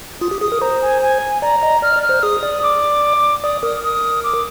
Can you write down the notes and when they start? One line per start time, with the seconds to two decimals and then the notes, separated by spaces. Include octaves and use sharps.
0.21 F4 D#6
0.31 G4
0.41 G#4 D#6
0.52 A#4
0.62 C5 A#5
0.82 G#5
1.02 G#5
1.42 D5 A#5
1.63 D#5
1.82 D5 F6
1.96 D5
2.03 F6
2.09 C5
2.23 G#4 D#6
2.43 D5
2.63 D6
3.43 D5 D#6
3.63 A#4 D#6
3.84 D#6
4.24 D6